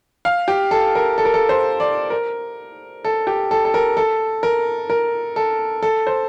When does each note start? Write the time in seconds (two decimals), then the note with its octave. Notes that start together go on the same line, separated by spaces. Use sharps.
0.25 F5
0.48 G4
0.71 A4
0.95 A#4
1.18 A4
1.25 A#4
1.34 A4
1.49 C5
1.80 D5
2.10 A#4
3.05 A4
3.27 G4
3.51 A4
3.65 A4
3.74 A#4
3.97 A4
4.43 A#4
4.90 A#4
5.36 A4
5.83 A4
6.07 C5